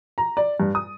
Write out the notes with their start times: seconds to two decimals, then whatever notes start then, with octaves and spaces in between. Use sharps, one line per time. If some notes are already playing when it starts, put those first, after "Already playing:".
0.18 A#5
0.37 D5
0.60 G2
0.75 D#6